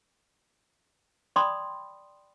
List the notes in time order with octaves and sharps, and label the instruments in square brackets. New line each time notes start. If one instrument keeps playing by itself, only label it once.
[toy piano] D5 G5 B5 C6 D#6